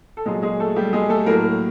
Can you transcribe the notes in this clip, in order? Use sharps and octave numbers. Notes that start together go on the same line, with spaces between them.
A4
A#2 F#3 G#3 G#4
G#3 G#4
A3 A4
G3 G4
G#3 G#4
A3 A4
A2 F#3 A#3 A#4